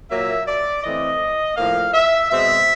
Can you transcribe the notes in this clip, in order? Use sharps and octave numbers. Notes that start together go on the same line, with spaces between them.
A#2 F#3 A#3 E5
D5
E3 A3 C4 D#5
A2 F3 A#3 F5
E5
B2 G#3 C4 E5